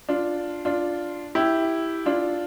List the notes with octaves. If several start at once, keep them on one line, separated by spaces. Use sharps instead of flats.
D4 F4
D4 F4
E4 G4
D4 F4